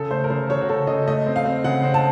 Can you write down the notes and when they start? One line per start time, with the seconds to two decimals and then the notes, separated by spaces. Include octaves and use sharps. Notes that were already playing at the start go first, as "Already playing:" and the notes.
Already playing: C#3 A4
0.11 A3 C5
0.24 A#4
0.30 C#3 C5
0.50 C#3 C#5
0.61 F#4
0.69 C#3 A4
0.87 C#3 D#5
1.07 A3 D#5
1.26 C4
1.36 F5
1.45 C4
1.64 C#3 F#5
1.84 C4
1.94 A5